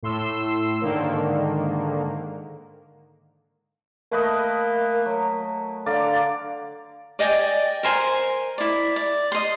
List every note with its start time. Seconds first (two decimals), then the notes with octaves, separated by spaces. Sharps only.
0.03 A2 C6 E6
0.82 G#2 D3 D#3 A#3
4.12 A3 A#3 B4 D#5
5.06 F#3
5.86 D3 D5 F5 A#5
7.19 D5 D#5 G5 G#5
7.83 A#4 C5 G#5 C6
8.58 E4 D5
8.96 D5
9.32 D#5 C6